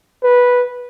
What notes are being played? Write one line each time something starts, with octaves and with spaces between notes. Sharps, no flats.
B4